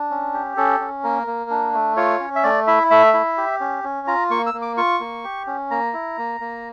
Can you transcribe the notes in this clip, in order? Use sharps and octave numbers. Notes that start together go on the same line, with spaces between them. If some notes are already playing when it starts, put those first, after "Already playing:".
Already playing: D4
C#4
G4
C#4 A4
C#4
A#3 A#4
A#3
D4
A3
F4 C#5
C#4
E5
A3 D5
E4 E5
A3 E5
E4
G4
C#4
C#4
F4 A#5
A#3 C#6
E6
A#3
D6
F4 C#6
A#3
G4
C#4
A#3 A#5
E4
A#3
A#3